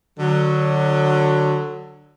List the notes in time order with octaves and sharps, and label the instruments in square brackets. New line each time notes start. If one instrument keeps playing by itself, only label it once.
[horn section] D3 F#3